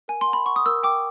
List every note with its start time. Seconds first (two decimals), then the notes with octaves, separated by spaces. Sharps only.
0.08 A#4 G#5
0.21 C6
0.27 F#5
0.33 B5
0.46 F#5 C#6
0.56 D#6
0.66 A#4 E6
0.83 G5 D6